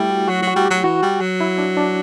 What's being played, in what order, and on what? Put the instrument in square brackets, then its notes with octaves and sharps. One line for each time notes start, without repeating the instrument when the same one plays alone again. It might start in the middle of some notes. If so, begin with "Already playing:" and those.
Already playing: [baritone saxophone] G3 [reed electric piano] A3 E4
[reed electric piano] F#4
[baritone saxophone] F#3 [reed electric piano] F#4
[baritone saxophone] F#3
[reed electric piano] F#4
[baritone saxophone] G3
[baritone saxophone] F#3 [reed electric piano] G4
[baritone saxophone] E3 [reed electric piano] F#4
[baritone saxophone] G3
F#3
[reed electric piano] E4
D4
D4